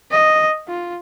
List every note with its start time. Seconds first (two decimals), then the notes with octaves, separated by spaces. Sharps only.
0.11 D#5
0.68 F4